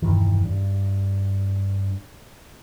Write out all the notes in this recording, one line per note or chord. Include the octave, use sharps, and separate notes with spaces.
E1 G2 D#3 E3
G2